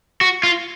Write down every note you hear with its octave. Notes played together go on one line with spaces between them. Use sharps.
F#4
F4